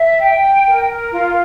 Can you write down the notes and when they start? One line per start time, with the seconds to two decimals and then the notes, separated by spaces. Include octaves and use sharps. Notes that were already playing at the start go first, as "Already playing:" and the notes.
Already playing: E5
0.21 G5
0.67 A#4
1.11 F4